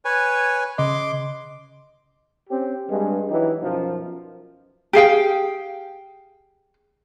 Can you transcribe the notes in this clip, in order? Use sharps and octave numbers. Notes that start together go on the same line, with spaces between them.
B4 C#5 G#5
C#3 D#5 C6 D6
C4 C#4 G4
G2 G#3
E3 F#3 D#4 G4
F#2 B2 F3 D#4
G4 G#4 F5 G5